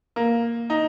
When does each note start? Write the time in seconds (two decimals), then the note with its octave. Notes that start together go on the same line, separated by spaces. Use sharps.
0.16 A#3
0.70 D#4